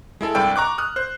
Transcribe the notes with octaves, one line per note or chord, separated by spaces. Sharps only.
G#3 E4 A4
C2 G2 D5 G5 E6
A#5 C#6 D6 F#6
D#6 F6 F#6
C5 F#6